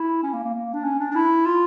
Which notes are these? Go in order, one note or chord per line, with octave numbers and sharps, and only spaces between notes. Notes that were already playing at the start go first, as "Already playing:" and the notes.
Already playing: E4
C#4
A#3
A#3
A#3
D4
C#4
D4
D4
E4
F4